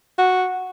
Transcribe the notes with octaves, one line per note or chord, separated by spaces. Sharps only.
F#4